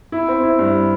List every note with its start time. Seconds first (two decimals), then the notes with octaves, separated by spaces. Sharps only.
0.12 E4
0.28 C4
0.43 E4
0.59 G2